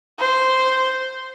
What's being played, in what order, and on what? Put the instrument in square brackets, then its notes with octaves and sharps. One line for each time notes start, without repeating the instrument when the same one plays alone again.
[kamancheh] C5